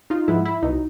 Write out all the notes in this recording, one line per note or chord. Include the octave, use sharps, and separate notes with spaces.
D#4 F4
G#2 F3 G#3 B3 E4
E4
C2 B2 F#3 D#4